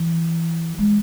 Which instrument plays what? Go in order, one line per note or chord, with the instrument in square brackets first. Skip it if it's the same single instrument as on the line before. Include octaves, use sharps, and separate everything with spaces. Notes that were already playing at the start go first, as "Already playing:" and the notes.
Already playing: [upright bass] E3
G#3